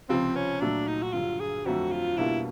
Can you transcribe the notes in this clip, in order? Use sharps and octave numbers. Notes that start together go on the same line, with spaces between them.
C#2 C3 F3 C4
C#4
A#2 F#3 A3 D4
D#4
F#4
G2 D3 F#3 F4
G#4
F2 D3 F#3 A3 F#4
F4
B2 G3 A#3 D4 E4 F4